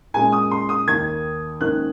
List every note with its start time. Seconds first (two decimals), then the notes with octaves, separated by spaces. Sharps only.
0.14 A#2 G#3 C#4 G#5
0.32 D#6
0.51 C6
0.69 D#6
0.88 D#2 D#3 A#3 G#6
1.61 G#2 D#3 A#3 C#4 F#6